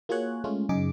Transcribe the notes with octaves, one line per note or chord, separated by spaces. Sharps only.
A#3 F4 F#4 G#4 C#5 F#6
G#3 A3 C#4 F4
F#2 C#3 D#4 G#4 D6